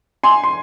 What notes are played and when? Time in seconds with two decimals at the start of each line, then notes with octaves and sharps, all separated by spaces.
0.23 G#5 C6
0.44 C6